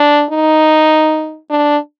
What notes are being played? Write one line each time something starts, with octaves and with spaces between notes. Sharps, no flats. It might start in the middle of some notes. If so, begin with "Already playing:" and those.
Already playing: D4
D#4
D4